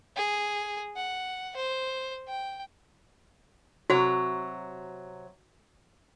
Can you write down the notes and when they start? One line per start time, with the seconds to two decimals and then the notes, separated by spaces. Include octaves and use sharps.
0.17 G#4
0.97 F#5
1.56 C5
2.28 G5
3.90 C3 F#3 F#4 C#5